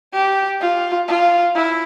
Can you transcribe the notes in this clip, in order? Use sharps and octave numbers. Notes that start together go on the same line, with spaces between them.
G4
F4
F4
E4